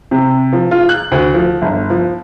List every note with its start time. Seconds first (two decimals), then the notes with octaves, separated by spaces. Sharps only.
0.11 C3
0.53 F3
0.71 F4
0.89 F#6
1.12 D2
1.34 F3
1.62 G1
1.90 F3